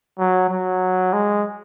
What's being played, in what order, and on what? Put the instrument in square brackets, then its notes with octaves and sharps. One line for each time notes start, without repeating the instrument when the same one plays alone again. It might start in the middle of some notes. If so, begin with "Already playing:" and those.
[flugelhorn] F#3
F#3
G#3